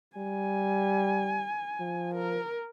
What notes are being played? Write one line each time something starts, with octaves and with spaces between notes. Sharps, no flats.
G3 G#5
F3
A#4